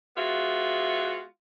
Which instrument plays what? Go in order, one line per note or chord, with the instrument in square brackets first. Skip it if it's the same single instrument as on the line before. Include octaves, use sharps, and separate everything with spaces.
[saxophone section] G#3 B3 F4 F#4 E5